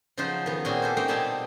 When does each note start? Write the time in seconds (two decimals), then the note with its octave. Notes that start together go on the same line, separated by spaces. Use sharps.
0.17 C#3 F3 F#3 D#4 F4 C5
0.46 D#3 B3
0.65 A#2 C4 C#4 F#4 G#4
0.82 G4 A4 C5
0.97 A#3 D#4 C5 G5
1.08 B2 G3 C4 G4 G#5 A5